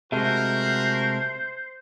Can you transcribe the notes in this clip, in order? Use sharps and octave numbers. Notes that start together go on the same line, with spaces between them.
C3 G#3 A3 F#4 A#4 C5 E5